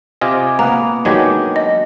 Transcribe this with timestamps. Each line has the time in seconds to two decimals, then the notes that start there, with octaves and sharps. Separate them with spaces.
0.21 C3 F4 D#5 G#5 D6
0.59 A#3 B3 B4 F#5 A#5
1.05 D#3 F#3 G#3 D4 G4 G#5
1.56 D#5